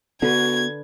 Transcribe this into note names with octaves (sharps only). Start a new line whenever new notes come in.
D3 B3 F#4 B4 G#6